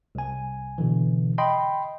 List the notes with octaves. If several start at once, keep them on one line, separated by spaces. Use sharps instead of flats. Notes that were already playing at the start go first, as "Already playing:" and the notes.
C2 G#5
B2 D3 E3
D#5 G5 B5 C6